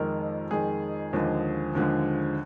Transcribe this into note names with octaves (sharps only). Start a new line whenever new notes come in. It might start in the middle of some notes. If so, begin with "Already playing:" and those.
Already playing: F2 D#3 G#3 A#4
F2 D#3 G#3 G#4
D#2 D3 F3 G#3
D#2 D3 F3 G#3